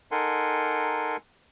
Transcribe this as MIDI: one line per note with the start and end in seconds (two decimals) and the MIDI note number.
0.12 1.17 63
0.12 1.17 69
0.12 1.17 70
0.12 1.17 78
0.12 1.17 80
0.12 1.17 84